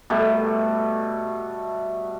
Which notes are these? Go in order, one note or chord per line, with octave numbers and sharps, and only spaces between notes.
B2 G3 A3